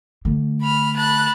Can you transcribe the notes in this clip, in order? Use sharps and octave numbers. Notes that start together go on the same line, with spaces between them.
D3 A3
B5 F6
A5 B5 F#6